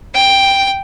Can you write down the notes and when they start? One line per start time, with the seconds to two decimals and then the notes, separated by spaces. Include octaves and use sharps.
0.14 G5